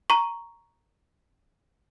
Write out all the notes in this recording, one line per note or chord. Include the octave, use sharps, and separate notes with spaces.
A#5 C#6